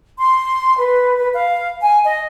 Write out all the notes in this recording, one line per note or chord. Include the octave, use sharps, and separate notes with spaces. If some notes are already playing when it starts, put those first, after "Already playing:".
C6
B4
B4
F5
G#5
D#5